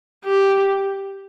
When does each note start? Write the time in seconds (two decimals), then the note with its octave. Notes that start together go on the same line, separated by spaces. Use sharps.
0.24 G4